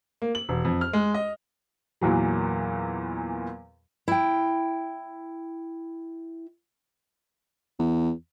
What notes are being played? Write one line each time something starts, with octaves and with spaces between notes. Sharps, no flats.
A#3
F#7
E1
F2
F6
G#3
D#5
E2 A#2 E3 F#3
E4 G5
E2